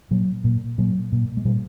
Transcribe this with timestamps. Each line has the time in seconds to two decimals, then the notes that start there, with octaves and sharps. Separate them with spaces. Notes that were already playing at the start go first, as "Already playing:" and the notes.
0.11 A#2 F#3
0.44 A#2
0.78 A#2 F#3
1.12 A#2
1.37 G#3
1.45 A#2 G3